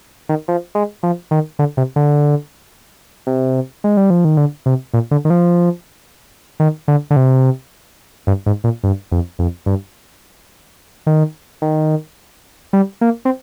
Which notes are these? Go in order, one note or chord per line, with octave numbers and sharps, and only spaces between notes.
D#3
F3
G#3
F3
D#3
D3
C3
D3
C3
G#3
G3
F3
D#3
D3
C3
A#2
D3
D#3
F3
D#3
D3
D3
C3
G2
G#2
A#2
G2
F2
F2
G2
D#3
D#3
G3
A#3
C4